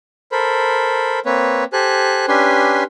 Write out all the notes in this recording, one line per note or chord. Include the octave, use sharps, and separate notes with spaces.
A4 A#4 C5 B5
A#3 C4 B4 C#5
G4 A4 C5 G#5 F#6
C#4 D4 G4 B4 G#5 C6